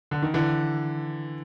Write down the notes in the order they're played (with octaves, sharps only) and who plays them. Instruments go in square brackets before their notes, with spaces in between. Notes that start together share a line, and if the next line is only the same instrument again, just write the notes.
[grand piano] D3
D#3
D3 E3